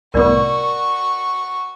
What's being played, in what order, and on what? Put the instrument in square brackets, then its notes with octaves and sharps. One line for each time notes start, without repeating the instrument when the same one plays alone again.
[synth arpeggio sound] C2 A2 B3 [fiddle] F#4 C#6 [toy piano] A#4 D5